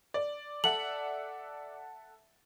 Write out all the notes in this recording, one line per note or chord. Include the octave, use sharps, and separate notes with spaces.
D5
A4 E5 F#5 F#7